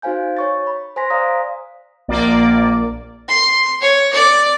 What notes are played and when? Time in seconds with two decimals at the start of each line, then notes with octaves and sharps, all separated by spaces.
0.02 D#4 F#4 C5 F5 G#5 G6
0.37 C#5 C#6 A6
0.67 B5
0.96 C5 G#5 C6 A#6 B6
1.10 C5 D5 F5 A#5 D#6
2.08 A#1 A#3 D5
3.29 C6
3.81 C#5
4.13 D5